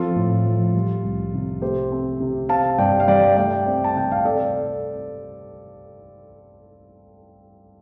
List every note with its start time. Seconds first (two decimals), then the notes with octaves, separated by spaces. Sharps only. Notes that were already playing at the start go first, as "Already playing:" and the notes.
Already playing: F3 C4 F4 A4
0.16 A2
0.45 F3
0.74 G3
1.04 C2
1.34 C3
1.62 A3 G4 C5
1.92 C4
2.20 C3
2.49 C4 F5 A5
2.78 G2 D5 G5
3.00 F5
3.08 G3 D5 G5
3.37 A3 D5 G5
3.66 C4
3.84 A5
3.95 C3 G5
4.12 F5
4.25 C4 A4 D5